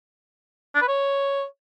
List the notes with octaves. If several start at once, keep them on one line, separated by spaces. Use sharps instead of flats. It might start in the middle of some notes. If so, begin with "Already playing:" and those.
D4
B4
C#5